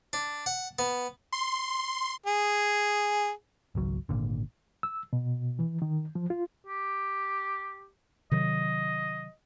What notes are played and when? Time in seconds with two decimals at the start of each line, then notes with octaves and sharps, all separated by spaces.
0.13 D4
0.46 F#5
0.79 B3
1.32 C6
2.26 G#4
3.75 G#1 C#2 F#3
4.09 G#1 A#2 D3
4.83 E6
5.13 B2
5.59 E3
5.82 D#3
6.15 F3
6.30 F4
6.67 G4
8.31 C3 D#3 F#3 D#5